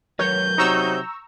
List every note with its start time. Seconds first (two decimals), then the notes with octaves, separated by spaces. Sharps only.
0.19 F#3 A#4 B4 C#5 G6
0.58 C3 F#3 D#4 C5 A#5 C#6 E6